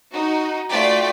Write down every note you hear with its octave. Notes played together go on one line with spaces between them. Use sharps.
D#4 F#4
A3 F4 F#4 D5 G5 B6